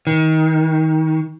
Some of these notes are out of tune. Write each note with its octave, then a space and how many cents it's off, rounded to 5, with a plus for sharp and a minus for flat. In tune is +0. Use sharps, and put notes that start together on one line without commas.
D#3 +25